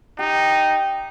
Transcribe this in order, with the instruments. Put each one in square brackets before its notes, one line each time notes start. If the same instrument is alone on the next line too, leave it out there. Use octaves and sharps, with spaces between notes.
[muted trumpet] D#4 [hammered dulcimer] G4